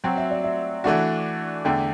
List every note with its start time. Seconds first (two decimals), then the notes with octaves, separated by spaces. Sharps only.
0.04 F#3 C4 F#4 G5
0.18 E5
0.31 D5
0.44 E5
0.84 E3 A3 D4 F#4 F#5
1.65 E2 D3 A3 G5